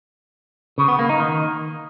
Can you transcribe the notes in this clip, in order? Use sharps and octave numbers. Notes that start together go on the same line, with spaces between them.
C#3
B3
A#3
D#4
D#3